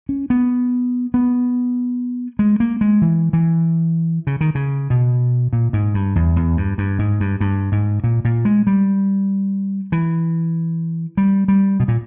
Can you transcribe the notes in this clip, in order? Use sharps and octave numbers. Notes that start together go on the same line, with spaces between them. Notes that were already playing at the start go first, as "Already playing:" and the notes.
C#4
B3
B3
G#3
A#3
G#3
E3
E3
C#3
D#3
C#3
B2
A#2
G#2
G2
E2
E2
G2
G2
G#2
G2
G2
G#2
A#2
A#2
G#3
G3
E3
G3
G3
B2
A#2